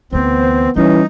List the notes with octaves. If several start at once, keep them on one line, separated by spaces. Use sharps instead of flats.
D2 E3 B3 C4 C5
E3 G3 C#4 D#4